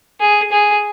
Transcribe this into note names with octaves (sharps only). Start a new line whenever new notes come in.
G#4
G#4